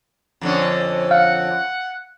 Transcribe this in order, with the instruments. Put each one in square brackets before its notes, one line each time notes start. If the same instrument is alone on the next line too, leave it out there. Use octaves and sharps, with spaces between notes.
[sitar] F2 D3 C#4
[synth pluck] F5 [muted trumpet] F#5